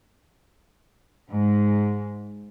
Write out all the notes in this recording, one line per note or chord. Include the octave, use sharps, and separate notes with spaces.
G#2